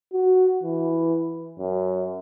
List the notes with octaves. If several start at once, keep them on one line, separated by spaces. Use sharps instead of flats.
F#4
E3
F#2